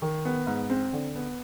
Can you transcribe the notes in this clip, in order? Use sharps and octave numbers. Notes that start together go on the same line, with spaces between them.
D#3
B3
G#2
C4
D3
B3